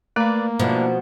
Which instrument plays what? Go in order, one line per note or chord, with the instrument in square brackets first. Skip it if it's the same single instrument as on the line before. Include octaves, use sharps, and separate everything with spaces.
[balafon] A3 [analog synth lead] A#3 [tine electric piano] B4 D5
[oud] B2 F3 [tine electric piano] D4 E4